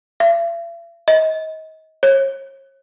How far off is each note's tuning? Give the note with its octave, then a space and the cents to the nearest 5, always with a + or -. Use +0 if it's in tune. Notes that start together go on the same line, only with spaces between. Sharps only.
E5 +45
D#5 +30
C#5 -35